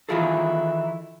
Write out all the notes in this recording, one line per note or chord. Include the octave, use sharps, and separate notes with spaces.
D#3 E3 E4 F4 G#4 A4